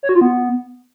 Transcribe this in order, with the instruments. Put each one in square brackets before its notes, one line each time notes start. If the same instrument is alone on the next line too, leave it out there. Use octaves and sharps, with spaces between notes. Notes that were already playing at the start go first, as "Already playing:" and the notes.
[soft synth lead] C#5
F#4
F4
B3